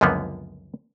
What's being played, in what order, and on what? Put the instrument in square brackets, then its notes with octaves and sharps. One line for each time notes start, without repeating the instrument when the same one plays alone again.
[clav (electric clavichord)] C#2 F#2 D3 F3 A#3 B3